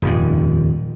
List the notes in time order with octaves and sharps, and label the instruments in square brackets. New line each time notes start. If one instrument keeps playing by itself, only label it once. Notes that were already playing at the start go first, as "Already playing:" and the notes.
[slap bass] D#1 F2 G#2